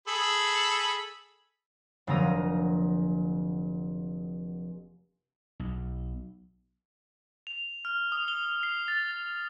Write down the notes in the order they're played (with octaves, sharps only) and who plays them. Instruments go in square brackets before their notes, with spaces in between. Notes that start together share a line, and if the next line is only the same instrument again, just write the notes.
[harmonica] G#4 A4 B5
[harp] F1 D3 F#3 A#3 A#5 D#6
[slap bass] B1
[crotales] F7
F6
D#6
G7
C7
A6
A6